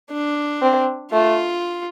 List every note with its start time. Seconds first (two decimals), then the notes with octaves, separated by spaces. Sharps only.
0.11 D4
0.62 C4
1.13 A3 F4